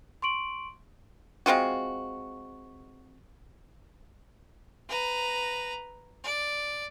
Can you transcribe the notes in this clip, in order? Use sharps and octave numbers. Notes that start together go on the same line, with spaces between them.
C6 C#6 D7 F#7
G#3 C4 F4 F#4
B4 A#5
D5